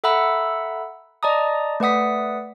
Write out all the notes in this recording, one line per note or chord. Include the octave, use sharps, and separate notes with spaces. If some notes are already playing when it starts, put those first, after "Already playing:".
A4 E5 F#5 A#5 B5 E6
D5 D#5 A5 A#5 D#6
A3 B4 D5 F#5 D#6 B6